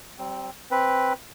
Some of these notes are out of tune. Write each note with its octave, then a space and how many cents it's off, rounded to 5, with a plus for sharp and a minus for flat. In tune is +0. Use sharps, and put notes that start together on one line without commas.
G3 -35 C4 +0
C4 +5 B4 +0